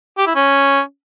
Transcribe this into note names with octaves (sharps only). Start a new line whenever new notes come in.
G4
E4
C#4